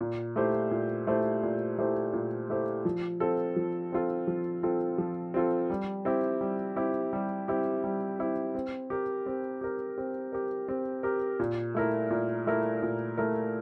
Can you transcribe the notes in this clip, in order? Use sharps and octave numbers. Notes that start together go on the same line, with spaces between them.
A#2
A3 E4 G4 C5
A#2
A3 E4 G4 C5
A#2
A3 E4 G4 C5
A#2
A3 E4 G4 C5
F3
C4 F4 A4
F3
C4 F4 A4
F3
C4 F4 A4
F3
C4 F4 A4
G3
C4 E4 G4
G3
C4 E4 G4
G3
C4 E4 G4
G3
C4 E4 G4
C4
G4 A#4
C4
G4 A#4
C4
G4 A#4
C4
G4 A#4
A#2
A3 E4 A#4
A#2
A3 E4 A#4
A#2
A3 E4 A#4